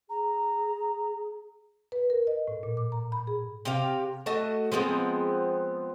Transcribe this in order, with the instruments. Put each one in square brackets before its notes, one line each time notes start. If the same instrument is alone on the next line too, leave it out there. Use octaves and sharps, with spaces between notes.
[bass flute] G#4 [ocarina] A#5
[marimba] B4
A#4
D#5
A2
A#2
D6
A#5
B5
G#4
[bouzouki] C3 G4 F5
A3 F#4 D#5 A5
F3 G#3 B3 C4